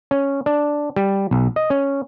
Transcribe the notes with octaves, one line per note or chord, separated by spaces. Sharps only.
C#4
D4
G3
B1
D#5
C#4